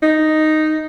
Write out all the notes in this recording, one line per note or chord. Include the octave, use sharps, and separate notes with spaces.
D#4